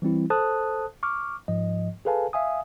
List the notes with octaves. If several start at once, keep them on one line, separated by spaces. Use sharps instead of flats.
E3 G3 C4 E4
A4 C5 A5 D#6 F#6
C#6 D6 F6
G#2 F3 D#5
G#4 A4 B4 F5 G#5 A5
E5 F5 G#5 D#6